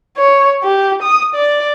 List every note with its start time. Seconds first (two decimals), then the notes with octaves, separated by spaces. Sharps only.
0.17 C#5
0.63 G4
1.03 D#6
1.35 D5